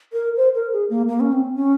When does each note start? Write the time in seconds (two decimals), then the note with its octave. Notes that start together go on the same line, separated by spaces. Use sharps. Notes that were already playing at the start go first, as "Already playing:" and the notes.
0.13 A#4
0.37 C5
0.55 A#4
0.73 G#4
0.90 A#3
1.08 A#3
1.20 C#4
1.33 C4
1.56 C#4